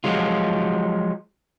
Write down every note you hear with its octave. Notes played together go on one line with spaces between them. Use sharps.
F3 F#3 G#3 F4